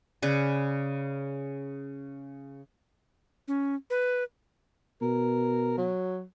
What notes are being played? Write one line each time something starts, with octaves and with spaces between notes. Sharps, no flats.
C#3 B4 D5
C#4
B4
B2 A#4
F#3